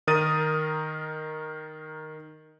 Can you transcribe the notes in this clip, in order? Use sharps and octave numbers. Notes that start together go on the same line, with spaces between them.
D#3 A#4 D#6 A6 D#7